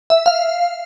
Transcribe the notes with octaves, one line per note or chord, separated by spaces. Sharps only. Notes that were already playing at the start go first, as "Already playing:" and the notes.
E5
F5